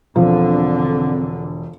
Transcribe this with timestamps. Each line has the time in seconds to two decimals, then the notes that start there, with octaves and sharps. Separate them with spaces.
0.16 E1 D3 F3 C4